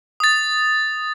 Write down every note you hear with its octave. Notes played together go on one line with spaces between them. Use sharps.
D#6 A6